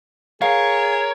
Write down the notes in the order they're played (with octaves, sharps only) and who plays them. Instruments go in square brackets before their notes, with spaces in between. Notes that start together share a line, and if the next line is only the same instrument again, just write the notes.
[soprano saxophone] G#4 [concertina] A#4 [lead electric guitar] C#5 [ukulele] F5